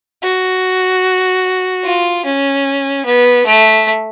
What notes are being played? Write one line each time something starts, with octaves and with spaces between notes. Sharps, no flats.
F#4
F4
C#4
B3
A3